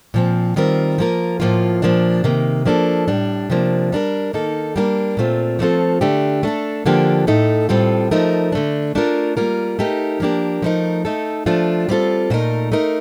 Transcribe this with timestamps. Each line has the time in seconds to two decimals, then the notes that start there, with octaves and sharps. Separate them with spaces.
0.14 A#2 F3 C4
0.56 D#3 G3 C4 F4 A#4
0.98 F3 A#3 F4 A#4
1.40 A2 F3 A#3 F4
1.82 A#2 F3 A#3 D4
2.24 C3 D#3 A#3
2.65 F3 A#3 D4 A4
3.08 A2 G3 D4
3.50 C3 F3 A#3 D4
3.92 G3 D4 G4 A#4
4.33 D#3 A#3 D#4 A4
4.76 G3 A#3 D4 G4 A#4
5.17 A#2 A3 C4 F4
5.59 F3 A3 C4 F4 A4
6.01 D3 A3 D4 G4
6.43 A3 D4 A4
6.86 D3 F3 A#3 D4 G4
7.27 A2 A3 D#4 A4
7.69 A2 G3 C4 F4 A4
8.11 F3 A3 D#4 A#4
8.52 D3 A3 D4
8.95 A3 D4 F4 A#4
9.37 G3 A#3 F4 A#4
9.79 A3 D#4 G4 A#4
10.20 F3 A#3 D4 G4 A#4
10.62 F3 A3 D#4 A#4
11.05 A3 D#4 A4
11.46 F3 A3 D4 F4
11.89 G3 C4 F4 A4
12.30 A#2 A3 D#4 A#4
12.72 A3 D#4 A#4